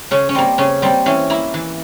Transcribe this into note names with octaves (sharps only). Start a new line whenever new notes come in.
C#3 C#4
C#4
G3 A#3 C4
C#3 C#4
G3 A#3 C4
E3 C#4
A#3 E4
E3